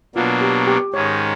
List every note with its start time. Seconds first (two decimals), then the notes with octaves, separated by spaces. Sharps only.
0.15 B2 F#3 A#3 D4 F4
0.41 G4
0.67 G4
0.93 G#2 D#3 G#3 C#4 C#5